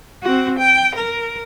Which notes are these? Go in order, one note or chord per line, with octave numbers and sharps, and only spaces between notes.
C4 F#4
G5
A#4